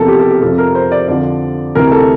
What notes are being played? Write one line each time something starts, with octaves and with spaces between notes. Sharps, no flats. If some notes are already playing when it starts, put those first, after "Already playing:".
Already playing: E2 C3 F3 A4 A#4
G4
A4
G4
F2 C3 F3 A4
A#4
C5
D5
F2 D3 F3 D5
D2 C3 E3 A#4
A4